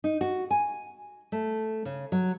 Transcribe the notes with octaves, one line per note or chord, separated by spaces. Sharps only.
D#4
F#4
G#5
A3
C#3
F#3